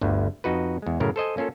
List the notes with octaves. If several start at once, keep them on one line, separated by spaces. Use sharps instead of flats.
G1 D2 G2
F2 D#4 F#4 B4
E2 G#3
F#2 A2 C#3 A#4
A4 C5 D#5 G#5
A#3 C#4 F4 A4